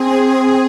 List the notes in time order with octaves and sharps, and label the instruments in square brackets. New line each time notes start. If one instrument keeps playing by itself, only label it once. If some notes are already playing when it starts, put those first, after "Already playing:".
Already playing: [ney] C4 [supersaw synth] G#4